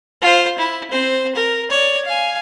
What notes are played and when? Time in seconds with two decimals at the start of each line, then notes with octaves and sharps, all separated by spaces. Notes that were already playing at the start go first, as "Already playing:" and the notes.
0.22 F4 C5
0.58 E4
0.91 C4 C5
1.35 A#4
1.70 C#5 D5
2.05 F5 G#5